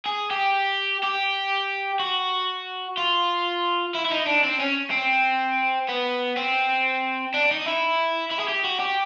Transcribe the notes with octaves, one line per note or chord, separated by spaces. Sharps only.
G#4
G4
G4
F#4
F4
E4
E4
D#4
D4
C4
C#4
C4
B3
C4
D4
D#4
E4
E4
G#4
G4
F#4
G4